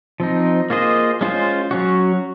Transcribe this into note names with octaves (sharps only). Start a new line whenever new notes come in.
F3 C4 D#4
A#3 F4 G#4 C5 D#5
G#3 C#4 F4 C5
F#3 C#4 F#4